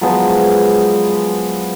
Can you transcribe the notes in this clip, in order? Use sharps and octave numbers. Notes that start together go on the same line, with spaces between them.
F3 F#3 G#3 B3